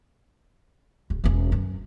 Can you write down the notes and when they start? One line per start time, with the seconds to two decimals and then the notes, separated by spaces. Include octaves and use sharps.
1.10 D1
1.24 E1 C#4
1.52 F#2